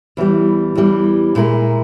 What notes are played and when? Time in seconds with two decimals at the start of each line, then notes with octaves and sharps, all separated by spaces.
0.17 E2 E3 G3
0.75 E2 E3 G3
1.35 A#2 G#3 E4 A#4